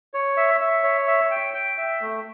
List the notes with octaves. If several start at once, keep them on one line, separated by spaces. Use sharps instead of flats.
C#5
E5
E5
C#5
E5
G5
G5
E5
A3